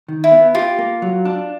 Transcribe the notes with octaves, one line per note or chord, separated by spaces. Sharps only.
D#3
E4
B3
F4 G4
A#3
F#3
D4